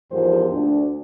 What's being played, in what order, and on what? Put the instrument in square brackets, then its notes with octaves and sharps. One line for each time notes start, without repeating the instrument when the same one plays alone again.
[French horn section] E2 G#2 F3 G4 A#4 C5
D2 D4